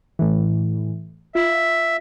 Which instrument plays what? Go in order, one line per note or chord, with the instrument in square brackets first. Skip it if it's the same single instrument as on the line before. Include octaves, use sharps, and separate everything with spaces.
[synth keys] A2 E3
[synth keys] F4 [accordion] E5